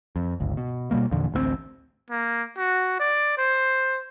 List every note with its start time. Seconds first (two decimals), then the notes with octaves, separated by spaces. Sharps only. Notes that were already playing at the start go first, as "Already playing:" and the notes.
0.16 F2
0.40 G1 C#2
0.57 B2
0.91 B2 D3 G3 A#3
1.11 E2 A#2 D3 F3
1.32 A1 D2 F#3 C4
2.10 A#3
2.58 F#4
3.00 D5
3.38 C5